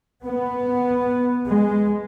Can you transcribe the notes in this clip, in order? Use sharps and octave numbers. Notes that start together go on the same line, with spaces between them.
B3
G#3